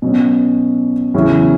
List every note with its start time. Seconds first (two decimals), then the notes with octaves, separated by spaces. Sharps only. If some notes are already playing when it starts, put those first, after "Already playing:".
0.02 B2 F#3 C#4
1.14 E2 C#3 F#3 C#4 E4